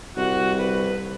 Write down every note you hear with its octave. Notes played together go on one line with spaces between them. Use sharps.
C2 F#4
B4